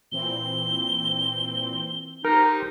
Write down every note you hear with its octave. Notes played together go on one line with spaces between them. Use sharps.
A#2 E3 C4 G7
D#4 G4 A#4 C5